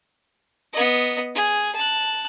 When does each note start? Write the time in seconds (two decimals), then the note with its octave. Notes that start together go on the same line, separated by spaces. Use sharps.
0.73 B3 D#5
1.35 G#4
1.75 A5 F#6